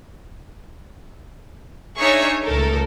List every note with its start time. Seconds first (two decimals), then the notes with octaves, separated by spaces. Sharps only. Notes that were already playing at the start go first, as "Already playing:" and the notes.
1.98 D4 D#4 G#4 C#5 E5 C#6
2.44 C#2 A3 A4 A#4